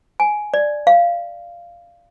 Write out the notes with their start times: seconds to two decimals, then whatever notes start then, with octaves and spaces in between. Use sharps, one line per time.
0.20 G#5
0.54 D5
0.87 F5